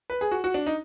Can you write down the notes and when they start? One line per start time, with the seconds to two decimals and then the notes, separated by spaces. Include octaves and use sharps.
0.10 B4
0.21 G#4
0.31 F#4
0.44 F#4
0.54 D4
0.66 D#4